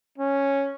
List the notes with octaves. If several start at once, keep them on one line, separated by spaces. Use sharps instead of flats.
C#4